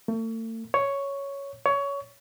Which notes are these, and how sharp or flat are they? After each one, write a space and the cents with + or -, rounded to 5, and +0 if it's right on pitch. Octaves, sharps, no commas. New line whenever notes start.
A3 +40
C#5 +5
C#5 +20